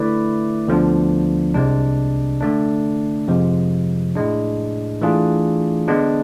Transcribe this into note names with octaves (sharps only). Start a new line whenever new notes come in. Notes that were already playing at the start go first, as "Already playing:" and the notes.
Already playing: D3 A3 E4 B4 D5
D2 D3 F3 B3 D4
C2 C3 G#3 D4
D3 A3 D4
F2 C3 F3 G#3
A2 G#3 D4
E3 A3 D4 F4 G#4
D3 G#3 B3 D4